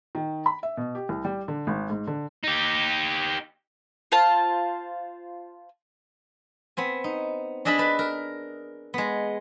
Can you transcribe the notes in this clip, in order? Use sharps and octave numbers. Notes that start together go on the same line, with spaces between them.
D#3
B5
E5
B2
G4
C2
G3
D3
G#1
G#2
D3
D#4 G4
F4 C5 A5
B3 C4 G#5
D#4
D4 G#4 D#5 E5 A5 B5
B4 A5
A#4
G#3 B3